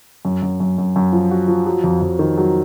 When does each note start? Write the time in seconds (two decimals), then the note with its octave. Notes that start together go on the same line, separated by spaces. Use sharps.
0.25 F#2
0.42 F#2
0.60 F#2
0.78 F#2
0.96 F#2
1.13 F3
1.31 F#4
1.48 F3
1.66 F#3
1.84 F2
2.02 F2
2.19 D#3
2.38 F#3